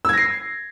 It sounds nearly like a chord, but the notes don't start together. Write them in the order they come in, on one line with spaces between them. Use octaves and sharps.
E6 G#6 A#6 C7